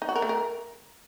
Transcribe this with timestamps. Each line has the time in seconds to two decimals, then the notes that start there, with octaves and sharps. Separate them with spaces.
0.02 D#4
0.09 F#4
0.15 A#4
0.22 A3
0.29 A#4